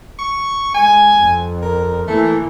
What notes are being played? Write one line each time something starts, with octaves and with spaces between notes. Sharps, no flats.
C#6
G#3 G#5
F2
A#4
E3 A3 A#3